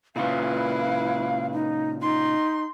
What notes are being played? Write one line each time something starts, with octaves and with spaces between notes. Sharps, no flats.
A#2 C#3 E4 F4 B4 F5
D#4
D#4 C6